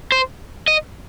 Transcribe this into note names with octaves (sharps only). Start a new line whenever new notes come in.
C5
D#5